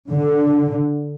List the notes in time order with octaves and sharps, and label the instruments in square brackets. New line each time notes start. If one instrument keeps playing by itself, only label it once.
[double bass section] D3